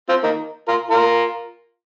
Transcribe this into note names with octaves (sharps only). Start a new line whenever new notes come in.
C4 F4
A#3 D#4
F4 A#4
F4 A#4